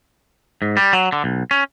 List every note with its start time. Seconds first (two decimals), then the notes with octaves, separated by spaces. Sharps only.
0.62 G#2
0.77 G3
0.93 F#3
1.13 D3
1.24 B1
1.51 C#4